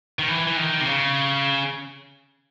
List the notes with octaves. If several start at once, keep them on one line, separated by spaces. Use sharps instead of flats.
D#3
E3
E3
D#3
C3
C#3